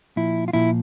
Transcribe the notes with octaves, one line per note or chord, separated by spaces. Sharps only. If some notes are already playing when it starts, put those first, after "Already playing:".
A#2 F3 E4
F4
A#2 F3 E4